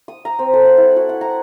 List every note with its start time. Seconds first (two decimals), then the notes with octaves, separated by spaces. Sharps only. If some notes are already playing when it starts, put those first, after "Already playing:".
0.08 D#6
0.25 A#5
0.39 C4
0.53 A4
0.65 F#5
0.77 E4
0.96 F#4
1.09 F#5
1.21 A#5